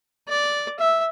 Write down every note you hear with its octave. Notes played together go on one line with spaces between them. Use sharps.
D5
E5